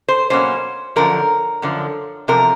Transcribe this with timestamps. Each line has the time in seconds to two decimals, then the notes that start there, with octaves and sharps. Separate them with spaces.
0.08 C5
0.30 B2 F#3 A#3 C#4 C5
0.96 F#2 D3 F3 A#4
1.62 F#2 D3 F3
2.28 E2 C3 F3 A#4